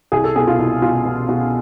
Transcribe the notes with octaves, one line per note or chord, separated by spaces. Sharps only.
C2 G#4
A4
B2 G#4
F4
C2
B2 F4
B2
B2